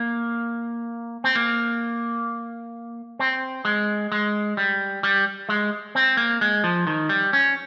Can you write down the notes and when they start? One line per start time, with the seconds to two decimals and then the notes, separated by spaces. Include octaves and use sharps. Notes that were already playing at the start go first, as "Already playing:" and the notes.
Already playing: A#3
1.24 C4
1.35 A#3
3.19 C4
3.65 G#3
4.12 G#3
4.57 G3
5.03 G3
5.49 G#3
5.95 C4
6.17 A#3
6.41 G#3
6.64 F3
6.87 D#3
7.09 G3
7.33 C#4